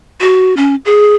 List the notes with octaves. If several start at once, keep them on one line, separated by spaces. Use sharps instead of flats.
F#4
C#4
G#4